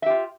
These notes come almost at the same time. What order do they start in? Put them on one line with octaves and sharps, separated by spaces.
E5 G4 F4